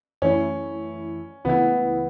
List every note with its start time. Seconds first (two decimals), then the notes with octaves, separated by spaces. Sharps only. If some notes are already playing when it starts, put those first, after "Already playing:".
0.22 F#2 E3 A3 C#4 E4
1.45 C#2 C#3 E3 A3 B3 E4